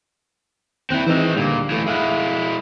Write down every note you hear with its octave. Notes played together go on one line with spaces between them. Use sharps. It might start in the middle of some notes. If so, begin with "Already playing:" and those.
D#2 C4 E4 F#6
E3 G#3 C4 D#4 E6
D2 A#2 D3 G3
E3 A3
G#3 E4 E5 F5 F#6